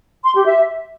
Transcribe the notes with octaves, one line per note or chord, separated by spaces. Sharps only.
C6
G4
E5